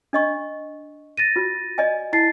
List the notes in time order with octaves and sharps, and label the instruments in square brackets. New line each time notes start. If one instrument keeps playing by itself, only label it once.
[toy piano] D4 D#5 C#6
[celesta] A6 A#6 D#7
[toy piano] F4 F#4
D5 D#5 G#5
[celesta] E4 A6 C7 [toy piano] A5